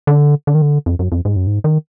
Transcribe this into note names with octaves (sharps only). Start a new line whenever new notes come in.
D3
D3
D#3
D3
F2
F#2
F2
G#2
F#2
G#2
D#3